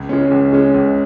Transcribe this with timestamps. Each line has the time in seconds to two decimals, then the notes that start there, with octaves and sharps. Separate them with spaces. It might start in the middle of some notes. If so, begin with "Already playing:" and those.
Already playing: C#2
0.09 C#3 G#3 C#4
0.31 C#2
0.53 C#3 G#3 C#4
0.74 C#2